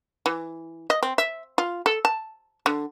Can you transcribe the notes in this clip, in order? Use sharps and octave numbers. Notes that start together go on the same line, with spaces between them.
E3
D#5
C4
E5
F4
A4
A5
D3